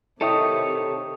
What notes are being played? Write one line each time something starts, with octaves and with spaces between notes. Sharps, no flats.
C3 D#3 E4 A4 C#5 D#5 G5 D#6